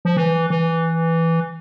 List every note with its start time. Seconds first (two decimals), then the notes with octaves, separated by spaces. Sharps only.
0.05 F3
0.17 E3
0.50 E3